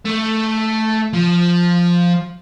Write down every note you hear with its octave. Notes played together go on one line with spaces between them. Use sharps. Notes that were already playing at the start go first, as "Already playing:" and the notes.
A3
F3